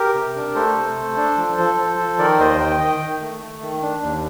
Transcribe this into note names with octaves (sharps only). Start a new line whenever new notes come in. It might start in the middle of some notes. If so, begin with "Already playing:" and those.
Already playing: G4 A#4
C3
D4
A3 A4 C5
C3
A3
D4
F3
F3
F3
F3
D#3 A#4 D5
D#2 C5 D#5
D#3 D#5 G5
D#3 D#5 G5
D#3
A3
A3
D#3
D4
D#2